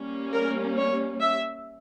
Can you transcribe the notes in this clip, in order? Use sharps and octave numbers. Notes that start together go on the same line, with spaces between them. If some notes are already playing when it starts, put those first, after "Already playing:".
Already playing: G3 A#3 C#4
A#4
C#5
E5